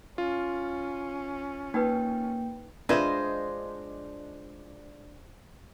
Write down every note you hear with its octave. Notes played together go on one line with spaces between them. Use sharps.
C#4 F4
A#3 D#4 B4 G5
G#3 D4 F4 B4 C5 D#5 E5 G#6